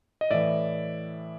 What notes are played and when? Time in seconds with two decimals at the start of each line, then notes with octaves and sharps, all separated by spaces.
0.21 D#5
0.31 A2 E3 D5 E5